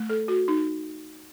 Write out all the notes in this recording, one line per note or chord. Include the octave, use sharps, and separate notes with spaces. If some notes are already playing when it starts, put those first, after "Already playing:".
Already playing: A3
A4
F#4
D#4